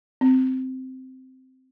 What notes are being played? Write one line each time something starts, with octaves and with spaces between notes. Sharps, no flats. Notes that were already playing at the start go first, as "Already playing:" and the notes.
C4